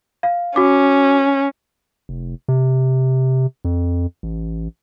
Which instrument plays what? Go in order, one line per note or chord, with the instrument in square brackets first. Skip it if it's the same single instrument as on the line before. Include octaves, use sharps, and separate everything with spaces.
[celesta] F5
[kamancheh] C#4 [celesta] F#4 D6
[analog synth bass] F1
C3
F2
A1